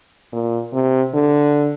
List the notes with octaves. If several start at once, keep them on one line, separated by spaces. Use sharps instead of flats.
A#2
C3
D3